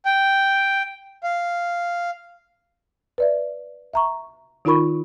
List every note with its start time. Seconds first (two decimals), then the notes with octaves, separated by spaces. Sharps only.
0.06 G5
1.23 F5
3.18 B4 D5 E5
3.93 E5 A#5 C#6
4.65 D#3 D#4 F4 A#4 B5 C#6